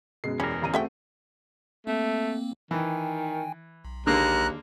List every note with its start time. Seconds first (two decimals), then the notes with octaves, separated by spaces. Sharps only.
0.24 F#2 B2 G#3 C7
0.40 E2 G3 C#4 A#4
0.62 A1 A#5 D#7
0.74 A3 C4 F#4 G#4 E5 G5
1.87 A3 A#3 C4
2.71 D#3 E3 G5 G#5
3.85 B1
4.07 D#2 D3 G#3 A#3 A#5 F#6